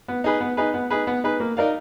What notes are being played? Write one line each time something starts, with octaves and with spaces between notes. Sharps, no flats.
B3
D#4 G#4 B4
B3
D#4 G#4 B4
B3
D#4 G#4 B4
B3
D#4 G#4 B4
A#3
D#4 A#4 D5 F5